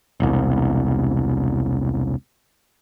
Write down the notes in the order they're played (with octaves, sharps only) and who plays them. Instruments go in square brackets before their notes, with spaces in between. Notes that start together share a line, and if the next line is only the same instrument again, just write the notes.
[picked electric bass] E1 C2